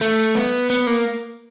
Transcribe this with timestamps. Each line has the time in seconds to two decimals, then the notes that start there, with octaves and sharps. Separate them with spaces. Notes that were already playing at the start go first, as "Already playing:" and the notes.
0.01 A3
0.35 B3
0.70 B3
0.87 A#3